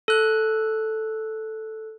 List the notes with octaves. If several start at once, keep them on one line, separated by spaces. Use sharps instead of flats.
A4 F#6